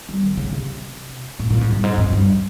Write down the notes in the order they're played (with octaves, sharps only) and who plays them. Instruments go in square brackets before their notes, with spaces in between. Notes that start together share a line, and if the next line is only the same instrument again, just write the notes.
[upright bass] G3
D#3
C#3
C3
A#2
A#2
G#2
G2
G#2
F2
G2